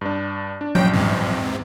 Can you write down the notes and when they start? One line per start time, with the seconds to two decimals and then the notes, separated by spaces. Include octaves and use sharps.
0.01 G2 D4
0.61 D4
0.75 A#1 G2 F#3 C#4 G5
0.93 E2 G#2 C3